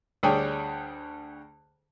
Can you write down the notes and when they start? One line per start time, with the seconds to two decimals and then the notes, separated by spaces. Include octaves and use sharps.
0.23 D2 G3 G#4 C#5 G5